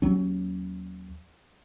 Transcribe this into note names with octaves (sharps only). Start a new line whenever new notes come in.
D#2 F#3 C#4